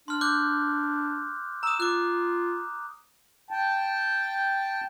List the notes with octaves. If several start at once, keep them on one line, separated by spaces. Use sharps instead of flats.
D4 C6 F6
D6 F#6 G6
A#5 D#6 E6
F4 D6 F#6
G5 A5